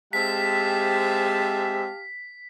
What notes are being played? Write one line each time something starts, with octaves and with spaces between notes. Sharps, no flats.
G#3 C4 G4 E5 F5 A5 B6